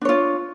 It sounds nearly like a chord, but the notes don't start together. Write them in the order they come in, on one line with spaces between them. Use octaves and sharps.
D4 C#5 F4